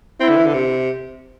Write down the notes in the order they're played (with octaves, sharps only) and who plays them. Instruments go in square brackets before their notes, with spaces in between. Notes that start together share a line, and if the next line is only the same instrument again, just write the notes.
[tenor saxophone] C4 [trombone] E4
[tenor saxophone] D3
E3
D3
C3